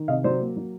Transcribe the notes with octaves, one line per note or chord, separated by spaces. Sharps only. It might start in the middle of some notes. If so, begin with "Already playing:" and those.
Already playing: D#3
C3 D#5 F5
F#3 C5 D5
A#3
F#3